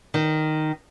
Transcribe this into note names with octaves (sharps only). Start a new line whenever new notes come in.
D#3